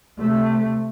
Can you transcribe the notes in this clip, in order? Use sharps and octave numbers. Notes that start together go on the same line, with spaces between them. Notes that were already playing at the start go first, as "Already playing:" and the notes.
C3 A3